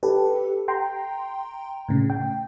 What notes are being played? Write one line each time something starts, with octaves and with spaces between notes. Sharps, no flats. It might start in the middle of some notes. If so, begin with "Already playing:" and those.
G4 A4 B4
G5 A#5 C6
A2 C#3
G5